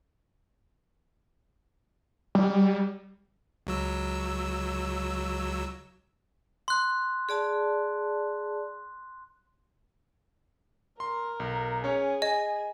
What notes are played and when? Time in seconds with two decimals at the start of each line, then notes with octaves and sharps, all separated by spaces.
2.35 G3
3.67 C#2 F#3 E6
6.68 C6 F#6
7.29 G#4 D5 A5
11.00 A#4 C6
11.40 B1
11.84 C#4 G#4 C#5
12.22 D#5 G#5